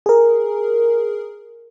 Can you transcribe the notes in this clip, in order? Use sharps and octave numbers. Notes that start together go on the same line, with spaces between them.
G#4 A#4